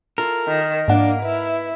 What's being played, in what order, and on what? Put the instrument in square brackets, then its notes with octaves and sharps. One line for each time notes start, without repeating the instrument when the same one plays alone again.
[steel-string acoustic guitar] E4 F4 A4 [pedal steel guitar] A#4
[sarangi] D#3
[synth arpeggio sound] G#2 F#5 [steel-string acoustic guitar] F3 D4 [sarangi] A#3
[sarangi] E4 [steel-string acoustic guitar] B4